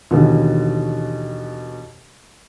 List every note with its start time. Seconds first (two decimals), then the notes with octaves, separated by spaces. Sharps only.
0.11 D#2 B2 D3 E3